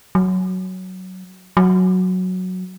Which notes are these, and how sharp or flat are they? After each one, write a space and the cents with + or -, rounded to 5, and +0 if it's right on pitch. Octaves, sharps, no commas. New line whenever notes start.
F#3 +5
F#3 -5